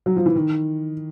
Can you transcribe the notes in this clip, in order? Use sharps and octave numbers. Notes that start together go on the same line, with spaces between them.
F#3
F3
E3
D#3